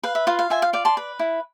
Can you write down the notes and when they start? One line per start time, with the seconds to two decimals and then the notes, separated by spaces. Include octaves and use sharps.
0.04 B4 F5
0.15 E5
0.27 F4 F5
0.39 F5
0.50 F4 E5 G#5
0.62 F5
0.73 D5 F5
0.85 A5 C6
0.97 B4
1.19 E4